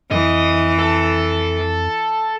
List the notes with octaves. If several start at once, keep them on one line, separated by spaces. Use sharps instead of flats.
F2 E3 D#5
A4